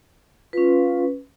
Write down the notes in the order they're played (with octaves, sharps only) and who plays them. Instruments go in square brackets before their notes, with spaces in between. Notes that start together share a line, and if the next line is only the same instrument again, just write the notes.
[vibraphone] C#4 B4 [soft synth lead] F4